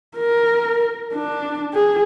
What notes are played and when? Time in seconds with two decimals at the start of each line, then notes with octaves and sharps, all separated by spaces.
0.17 A#4
1.14 D4
1.74 G#4